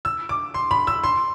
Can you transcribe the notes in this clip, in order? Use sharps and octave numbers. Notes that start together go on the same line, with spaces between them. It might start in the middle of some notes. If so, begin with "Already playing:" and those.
E6
D6
C6
B5
E6
C6